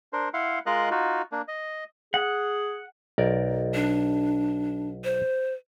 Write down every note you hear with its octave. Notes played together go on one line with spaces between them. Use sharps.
D4 A#4 C5
E4 F5 F#5 C6
G#3 F4 A#4 D#5 F5 F#6
D#4 F4 F#4
A#3 D4
D#5
G#4 F#5
B1 A#4 D5
D4
C5